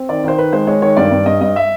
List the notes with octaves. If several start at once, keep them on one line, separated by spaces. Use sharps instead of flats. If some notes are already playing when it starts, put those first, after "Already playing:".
Already playing: C4
D#3 D5
D#3 C5
D#3 B4
G#3 C5
G#3 C#5
D#3 C#5
G2 D5
G2
G2 D#5
G2 D#5
E5